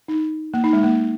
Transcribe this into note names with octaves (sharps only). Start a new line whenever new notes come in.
D#4
A#3
D#4
G#3
A#3